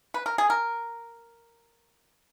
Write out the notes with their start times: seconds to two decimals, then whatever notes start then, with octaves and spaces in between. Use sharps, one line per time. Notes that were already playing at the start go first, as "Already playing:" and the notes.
0.14 B4
0.26 A#4
0.38 G#4
0.50 A#4